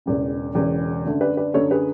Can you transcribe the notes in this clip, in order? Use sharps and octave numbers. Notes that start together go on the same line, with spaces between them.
E1 E2 C#3
E1 E2 C#3
F#2 D3 A3
B4 D5
B4 D5
F#2 D3 A3 A4 C#5
G#4 B4